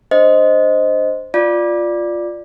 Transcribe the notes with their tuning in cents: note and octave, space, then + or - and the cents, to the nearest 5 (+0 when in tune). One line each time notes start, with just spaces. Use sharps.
D4 +0 C5 +0 D#5 +0
F4 +0 D5 +5